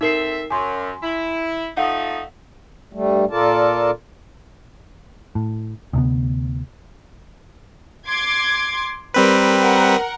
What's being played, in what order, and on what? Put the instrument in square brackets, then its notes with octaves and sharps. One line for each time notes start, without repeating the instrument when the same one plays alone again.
[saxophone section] C4 A4 E5 [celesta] D#4 A#4 C7
[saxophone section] F#2 [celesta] G#5 C6
[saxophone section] E4
[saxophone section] F3 A3 D#4 [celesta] F5 F#5
[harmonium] G2 G3 A3
A#2 F4 A4 A#4 D5 A5
[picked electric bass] A2
D2 C3 B3
[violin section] C6 D6 G#6
[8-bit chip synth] G3 C4 B4 [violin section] A#4
[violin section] A#4 F#5